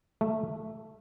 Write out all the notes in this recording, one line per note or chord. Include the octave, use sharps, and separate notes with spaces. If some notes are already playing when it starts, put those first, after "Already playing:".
A3